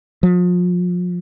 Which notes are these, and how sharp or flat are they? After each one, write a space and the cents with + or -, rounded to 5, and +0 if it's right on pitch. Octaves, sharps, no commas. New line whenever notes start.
F3 +35